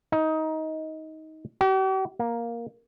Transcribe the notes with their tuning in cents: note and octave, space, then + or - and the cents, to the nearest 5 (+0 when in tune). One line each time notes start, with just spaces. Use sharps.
D#4 +20
G4 -45
A#3 +5